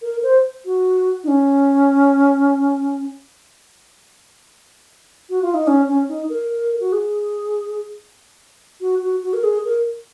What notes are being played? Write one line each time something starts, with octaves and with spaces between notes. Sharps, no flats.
A#4
C5
F#4
D#4
C#4
F#4
F4
D#4
C#4
C#4
D#4
A#4
F#4
G#4
F#4
F#4
F#4
A#4
G#4
A#4